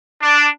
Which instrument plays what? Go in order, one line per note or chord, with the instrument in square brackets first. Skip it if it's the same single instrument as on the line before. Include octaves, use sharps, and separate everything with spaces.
[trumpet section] D4